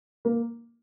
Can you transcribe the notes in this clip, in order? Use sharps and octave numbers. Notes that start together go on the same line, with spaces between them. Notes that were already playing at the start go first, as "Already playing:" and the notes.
A#3